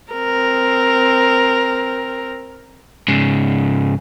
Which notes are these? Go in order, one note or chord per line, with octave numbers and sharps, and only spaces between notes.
C4 A#4
G#2 C#3